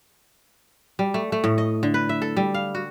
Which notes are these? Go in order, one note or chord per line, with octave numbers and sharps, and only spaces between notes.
G3
A3
A3
A2
D#5
D3
B4
E5
A4
G3
F5
F#4